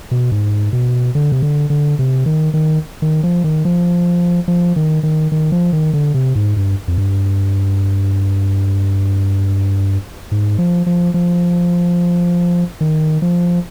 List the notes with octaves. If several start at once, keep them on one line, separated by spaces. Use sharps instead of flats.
B2
G#2
B2
D3
C3
D3
D3
C3
D#3
D#3
D#3
F3
D#3
F3
F3
D#3
D#3
D#3
F3
D#3
D3
C3
G#2
G2
F2
G2
G#2
F3
F3
F3
D#3
F3